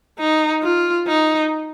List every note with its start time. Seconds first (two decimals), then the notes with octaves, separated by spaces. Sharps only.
0.19 D#4
0.63 F4
1.08 D#4